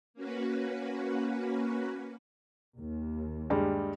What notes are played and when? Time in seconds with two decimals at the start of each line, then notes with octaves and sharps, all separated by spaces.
0.14 A#3 C#4 F#4 B4
2.76 D#2
3.50 G2 G3 G#3